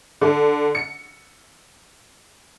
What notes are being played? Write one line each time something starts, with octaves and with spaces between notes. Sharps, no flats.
D3
C#7